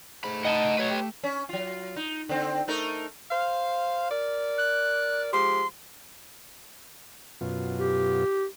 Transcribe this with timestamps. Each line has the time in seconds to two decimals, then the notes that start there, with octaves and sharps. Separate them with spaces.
0.24 G#2 A3 B5
0.45 D#4 D#5 F#5 G#5 A5
0.78 F#3 B4 C#5
0.90 G4
1.24 C#4
1.49 F#3 F4
1.96 D#4
2.29 D3 C4
2.68 A3 D#4 A#4
3.31 C5 F5
4.11 A#4 D5
4.58 F#6
5.33 F3 G#3 G4 C6
7.41 F#2 B2 F4
7.79 G4